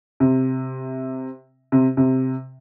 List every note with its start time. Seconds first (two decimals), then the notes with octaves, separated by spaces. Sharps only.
0.20 C3
1.72 C3
1.97 C3